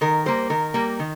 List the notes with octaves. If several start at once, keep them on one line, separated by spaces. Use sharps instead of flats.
D#3 A#4
G3 A#3 C5
D#3 A#4
G3 A#3
D#3